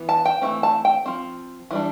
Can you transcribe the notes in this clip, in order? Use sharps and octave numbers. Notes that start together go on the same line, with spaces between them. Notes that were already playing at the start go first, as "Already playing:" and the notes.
Already playing: E3 B3
A5
G5
E3 A3 C4
A5
G5
F3 C4
E3 G3 D4